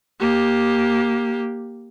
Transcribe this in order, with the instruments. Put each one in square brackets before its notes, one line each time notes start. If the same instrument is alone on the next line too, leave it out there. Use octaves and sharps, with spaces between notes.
[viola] A#3 G4